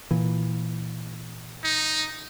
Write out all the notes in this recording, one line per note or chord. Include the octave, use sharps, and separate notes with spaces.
A#2 E3
D#4